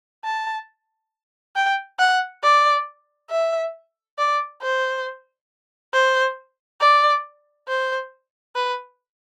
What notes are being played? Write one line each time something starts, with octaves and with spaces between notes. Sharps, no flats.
A5
G5
F#5
D5
E5
D5
C5
C5
D5
C5
B4